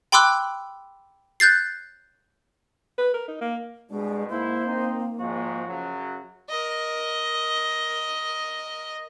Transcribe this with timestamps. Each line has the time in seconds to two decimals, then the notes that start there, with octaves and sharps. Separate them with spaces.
0.12 G5 B5 C6 D6 E6 F#6
1.40 F#6 G6 A6 C7
2.98 B4
3.14 A#4
3.28 D#4
3.41 A#3
3.90 C2 G2 B2 G#3 D4
4.30 G#2 A#3 E4 C5
4.65 C4 D#4
5.19 G#1 G#2 F3 F#4
5.65 F#2 C#3 F#3
6.49 A#4 D#5